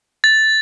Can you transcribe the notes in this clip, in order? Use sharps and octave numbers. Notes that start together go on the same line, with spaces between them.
A6